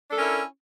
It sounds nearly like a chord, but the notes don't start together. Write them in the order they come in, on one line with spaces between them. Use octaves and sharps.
D4 A4 C#4 A#4 E4